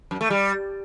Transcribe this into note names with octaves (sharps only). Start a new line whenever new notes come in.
F#2
A3
G3